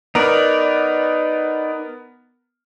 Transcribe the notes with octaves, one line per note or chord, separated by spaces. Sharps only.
B3 D#4 A#4 D5